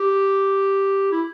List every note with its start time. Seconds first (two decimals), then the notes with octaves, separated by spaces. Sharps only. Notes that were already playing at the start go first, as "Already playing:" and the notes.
Already playing: G4
1.12 E4